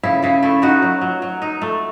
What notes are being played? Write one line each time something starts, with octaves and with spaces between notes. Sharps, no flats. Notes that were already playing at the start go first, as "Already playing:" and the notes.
C#3 E4
C#3 E4
A3 E4
A3 D#4 F#4
F#3
F#3
F#3
D#4
A3